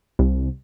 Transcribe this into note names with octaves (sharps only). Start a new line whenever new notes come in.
C2